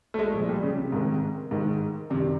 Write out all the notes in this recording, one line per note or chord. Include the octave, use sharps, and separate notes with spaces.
A3
G#3
A#2 F3 G#3
G3
C#3
C3
G#2 D#3 G#3
G#2 D#3 G#3
F#2 C3 D#3 G3